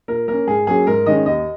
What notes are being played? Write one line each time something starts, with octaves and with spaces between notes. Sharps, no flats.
A#2 A#4
A#3 C#4 A#4
G#2 G#4
F#3 A#3 C#4 G#4
G#2 A#4
D#3 G#3 C#4 D#5
D#2 D#5